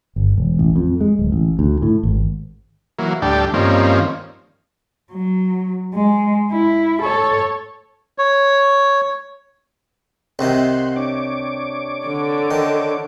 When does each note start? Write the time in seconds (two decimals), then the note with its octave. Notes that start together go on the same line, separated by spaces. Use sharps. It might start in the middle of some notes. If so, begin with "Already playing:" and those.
0.16 G1
0.38 E1
0.59 A1
0.76 F2
1.01 G#3
1.19 D1
1.32 A1
1.59 D2
1.82 A2
2.03 G#1
2.99 E3 F#3 A#3
3.22 D2 A2 G3 D4 G5 A5
3.54 G2 D#3 F3 A#3 C4 C#4
5.11 F#3
5.94 G#3
6.52 E4
7.03 A4 C#5
8.18 C#5
10.39 C2 C3 D#3 F#5 C6
10.96 D4 C#5 D6
12.07 D3
12.51 D#3